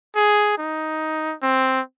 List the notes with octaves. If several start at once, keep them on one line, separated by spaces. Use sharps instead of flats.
G#4
D#4
C4